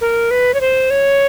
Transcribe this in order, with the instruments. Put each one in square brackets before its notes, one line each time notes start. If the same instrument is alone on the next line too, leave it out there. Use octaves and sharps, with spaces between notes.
[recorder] A#4
B4
C#5
C5
C#5